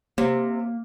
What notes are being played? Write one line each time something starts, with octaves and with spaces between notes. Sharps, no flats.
C3 A#3